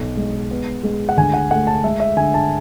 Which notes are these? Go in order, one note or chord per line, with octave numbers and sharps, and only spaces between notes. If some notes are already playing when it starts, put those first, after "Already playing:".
Already playing: B1
G#3
B3
G#3
F#5
D2 G#5
F#5
A3 F#5
A5
G#3 E5
E5
D3 G#5
A5